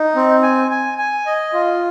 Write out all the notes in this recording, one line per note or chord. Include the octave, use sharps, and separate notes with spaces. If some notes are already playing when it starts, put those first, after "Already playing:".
Already playing: D#4
C4
G#5
G#5
G#5
D#5
F4